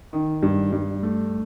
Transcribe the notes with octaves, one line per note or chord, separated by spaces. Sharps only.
D#3
G2
G2
A3